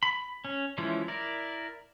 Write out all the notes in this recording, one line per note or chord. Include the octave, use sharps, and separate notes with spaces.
B5
C#4
E3 F3 G#3 C#4 E4
E4 A#4 D5